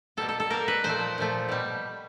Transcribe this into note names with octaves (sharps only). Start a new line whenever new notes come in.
B2 G3 A#3 A4
A4
A4
B2 G3 A#3 A#4
B4
A#2 F3 A3 C5
A#2 F3 A3
B2 G3